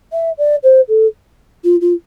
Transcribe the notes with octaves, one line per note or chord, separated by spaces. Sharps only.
E5
D5
C5
A4
F4
F4